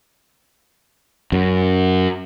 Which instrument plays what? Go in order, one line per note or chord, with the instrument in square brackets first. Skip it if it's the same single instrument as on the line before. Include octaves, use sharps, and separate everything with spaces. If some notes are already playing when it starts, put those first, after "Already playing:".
[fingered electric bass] F#2